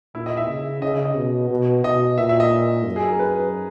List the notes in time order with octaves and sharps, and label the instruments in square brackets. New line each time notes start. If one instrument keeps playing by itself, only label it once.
[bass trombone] A#2 [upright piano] E4
[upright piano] D#5
E5
[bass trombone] C#3
[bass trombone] C#3 [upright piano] D#5
[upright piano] D#5
D#5
[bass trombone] B2
B2
[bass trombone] B2 [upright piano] D#5
[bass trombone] A#2 [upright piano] E5
[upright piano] E5
D#5
[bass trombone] F#2
[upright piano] G#4
A#4
B4